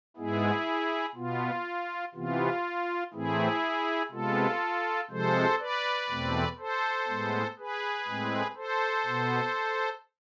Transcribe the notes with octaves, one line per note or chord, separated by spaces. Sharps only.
G#2 G#3 B3 E4 G#4
B2 B3 F4
C3 E3 B3 F4
A2 E3 A3 C4 E4 G#4
C3 G#3 B3 F4 A4
C3 F3 G#3 A4 C5
B4 D5
E2 B2 A3 C4
A4 C5
A2 G#3 B3
G#4 B4
A2 G#3 C4
A4 C5
B2 B3